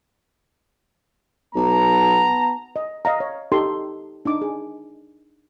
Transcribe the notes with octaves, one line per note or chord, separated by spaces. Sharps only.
B1 B3 A5 A#5
D#5
D#5 F5 A#5
C#5
D#4 G4 A4 C6
D4 D#4 D6
G#4